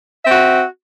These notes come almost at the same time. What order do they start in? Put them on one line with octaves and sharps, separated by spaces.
E5 C4 F#4